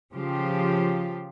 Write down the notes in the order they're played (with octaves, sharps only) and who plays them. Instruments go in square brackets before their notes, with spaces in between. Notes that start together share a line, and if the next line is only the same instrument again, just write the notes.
[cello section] C#3 F3 F4 G4